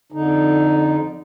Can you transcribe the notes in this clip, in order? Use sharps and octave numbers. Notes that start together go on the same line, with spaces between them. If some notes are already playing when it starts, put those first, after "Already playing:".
F2 D3 D#4